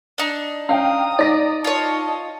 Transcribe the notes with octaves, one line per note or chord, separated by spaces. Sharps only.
D4 D#4
C#4 F5 G5 A#5 D#6
D#4 D5 A#6
F4 C#5 D#5 A5